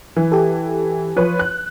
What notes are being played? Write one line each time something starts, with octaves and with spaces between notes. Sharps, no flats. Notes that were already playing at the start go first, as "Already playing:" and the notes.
E3
G4 A4
F3 B4 C#5
F#6